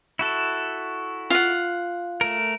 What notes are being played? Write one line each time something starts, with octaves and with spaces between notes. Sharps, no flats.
E4 F#4 A4
F4 F#5
A3 A#4